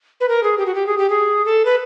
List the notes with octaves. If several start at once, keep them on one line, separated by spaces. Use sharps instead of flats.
B4
A#4
G#4
G4
F#4
G4
G#4
G4
G#4
A4
B4